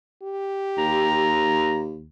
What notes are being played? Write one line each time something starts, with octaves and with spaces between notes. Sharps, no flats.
G4
D#2 A#5